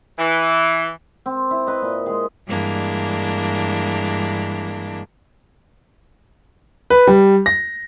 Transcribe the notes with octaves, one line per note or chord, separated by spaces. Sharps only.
E3
C4
E4
B4 D#5
A#2
G#3 G#4
G2 E3 G#3 A#3 D4
B4
G3
A#6